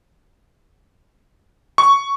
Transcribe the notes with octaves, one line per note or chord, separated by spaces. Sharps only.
C#6